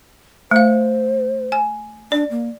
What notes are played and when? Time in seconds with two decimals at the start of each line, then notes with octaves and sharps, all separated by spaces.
0.51 A3 C5 F5
1.52 G#5
2.12 D4 D5
2.31 A#3